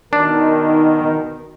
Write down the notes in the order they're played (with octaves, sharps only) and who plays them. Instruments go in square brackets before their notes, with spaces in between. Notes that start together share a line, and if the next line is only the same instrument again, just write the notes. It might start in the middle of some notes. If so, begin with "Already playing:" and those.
[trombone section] B2 A#4 [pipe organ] D#3 [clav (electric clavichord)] D4